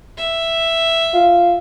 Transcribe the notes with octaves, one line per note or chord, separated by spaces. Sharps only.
E5
F4